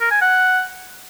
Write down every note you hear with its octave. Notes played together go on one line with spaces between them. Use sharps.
A#4
G#5
F#5